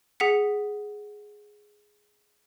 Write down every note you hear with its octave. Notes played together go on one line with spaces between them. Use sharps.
G#4 F#5 B6 C#7